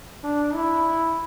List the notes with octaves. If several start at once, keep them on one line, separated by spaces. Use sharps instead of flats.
D4
E4